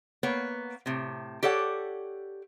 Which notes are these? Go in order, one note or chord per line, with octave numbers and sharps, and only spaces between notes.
A#3 B3 C#5
A2 C3
G4 A4 C#5 D5 F#5